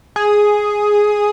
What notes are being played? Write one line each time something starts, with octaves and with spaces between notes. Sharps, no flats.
G#4